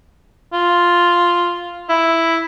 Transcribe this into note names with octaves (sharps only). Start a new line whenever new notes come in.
F4
E4